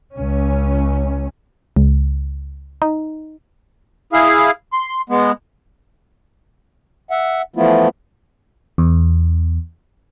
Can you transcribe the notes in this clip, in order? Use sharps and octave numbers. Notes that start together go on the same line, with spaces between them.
C#2 C#4
C#2
D#4
E4 G#4 F5
C6
G#3 B3
E5 F#5
E3 F3 A3 B3 E4 F4
E2